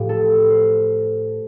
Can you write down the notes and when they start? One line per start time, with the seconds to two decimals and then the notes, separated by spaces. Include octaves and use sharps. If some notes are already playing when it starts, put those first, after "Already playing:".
Already playing: A2 F3 G4
0.09 A4
0.50 C5